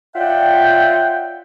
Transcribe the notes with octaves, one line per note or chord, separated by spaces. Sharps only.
F4 C#5 D5 E5 F#5 G5